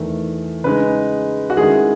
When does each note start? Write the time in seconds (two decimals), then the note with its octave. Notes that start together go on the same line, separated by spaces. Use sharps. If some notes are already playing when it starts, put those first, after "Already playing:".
Already playing: E2 D#3 A3
0.64 C#3 G#3 D#4 B4
1.50 F#4
1.57 D#3 G#3 C#4 E4 G#4